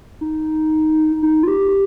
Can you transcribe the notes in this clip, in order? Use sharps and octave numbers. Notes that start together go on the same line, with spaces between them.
D#4
D#4
F4
G4